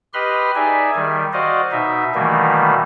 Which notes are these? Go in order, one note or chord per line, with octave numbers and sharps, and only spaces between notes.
G4 B4 D#5 B5 C6 F6
D#4 G#4 D5 E5 G#5
D#3 G3
F#4 C5 D5 D#5 F5
B2 D#4 E5
B2 D#3 E3 G3 A3 A#3